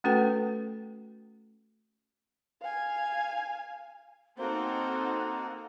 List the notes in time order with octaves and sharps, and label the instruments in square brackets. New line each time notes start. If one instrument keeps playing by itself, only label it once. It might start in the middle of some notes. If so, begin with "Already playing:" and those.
[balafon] A3 C#4 F#4 A4 B4 G5
[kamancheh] F5 G#5
[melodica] A#3 [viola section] C4 D#4 [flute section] F#4 A4 [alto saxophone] C5